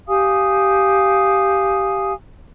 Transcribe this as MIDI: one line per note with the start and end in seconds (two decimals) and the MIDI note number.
0.08 2.13 67
0.08 2.13 77
0.08 2.13 80
0.08 2.13 87